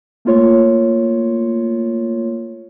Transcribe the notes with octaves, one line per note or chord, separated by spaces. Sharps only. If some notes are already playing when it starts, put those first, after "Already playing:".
A3 A#3 F4 C#5